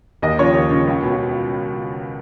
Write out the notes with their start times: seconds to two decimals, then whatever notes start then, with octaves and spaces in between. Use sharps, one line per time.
0.22 D#2 D#5
0.39 C#3 F3 C#5
0.55 D#2
0.71 C#3 F3
0.87 C#2
1.02 B2